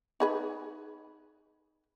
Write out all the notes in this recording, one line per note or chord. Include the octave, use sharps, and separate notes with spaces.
D#4 G#4 B4